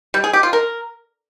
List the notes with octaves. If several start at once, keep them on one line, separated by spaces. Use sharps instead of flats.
G3
G#4
G4
F4
A#4